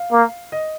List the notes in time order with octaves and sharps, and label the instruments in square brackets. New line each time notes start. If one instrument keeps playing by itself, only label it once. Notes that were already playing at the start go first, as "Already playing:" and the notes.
Already playing: [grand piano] F5
[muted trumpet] A#3
[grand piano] D#5